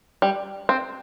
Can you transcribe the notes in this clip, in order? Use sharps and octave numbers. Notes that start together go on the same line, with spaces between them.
G3
C4